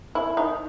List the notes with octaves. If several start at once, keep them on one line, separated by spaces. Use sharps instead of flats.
E4
D#4